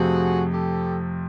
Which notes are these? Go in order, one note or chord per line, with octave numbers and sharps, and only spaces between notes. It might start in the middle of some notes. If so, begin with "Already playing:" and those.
Already playing: F2 C3 F3 A3 F#4 G#4
G4 A4